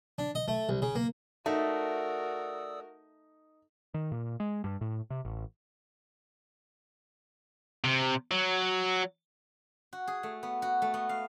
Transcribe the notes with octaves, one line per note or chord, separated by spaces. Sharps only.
D4
D#5
A3
C2
C#3
A#3
A3 D#4 F#4 A#4 D5 D#6 E6
D#3
A#2
G#3
G2
A2
C3
A1
C3
F#3
F#4
G#4
A3
B3
F#4
A3
B3
F5